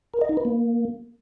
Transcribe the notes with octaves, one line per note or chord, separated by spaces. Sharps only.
A#4
D#5
D#4
B4
A#3